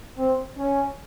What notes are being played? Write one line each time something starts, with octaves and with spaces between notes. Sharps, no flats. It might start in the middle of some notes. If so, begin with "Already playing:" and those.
C4
C#4